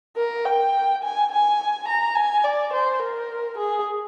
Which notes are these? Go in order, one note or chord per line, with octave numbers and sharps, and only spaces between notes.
A#4
G5
G#5
G#5
A#5
G#5
D5
C5
A#4
G#4